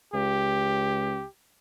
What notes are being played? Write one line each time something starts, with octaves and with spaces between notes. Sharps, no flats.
C#2 G4